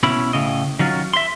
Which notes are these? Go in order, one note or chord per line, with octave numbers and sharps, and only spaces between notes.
B2 C#4 E4 B5
A2 C#3 D#5
D#3 F#3 C#4 F4
E5 C6